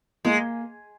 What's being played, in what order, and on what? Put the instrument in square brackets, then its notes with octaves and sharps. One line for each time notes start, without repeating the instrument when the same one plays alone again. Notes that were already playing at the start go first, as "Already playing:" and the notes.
[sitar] G#3 [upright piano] A#3